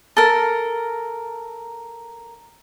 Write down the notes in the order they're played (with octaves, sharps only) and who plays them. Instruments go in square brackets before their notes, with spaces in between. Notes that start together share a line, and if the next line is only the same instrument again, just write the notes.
[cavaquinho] A4 A#4